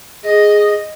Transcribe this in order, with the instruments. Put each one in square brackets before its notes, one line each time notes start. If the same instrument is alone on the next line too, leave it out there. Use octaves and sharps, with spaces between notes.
[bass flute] G#4 [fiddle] D#5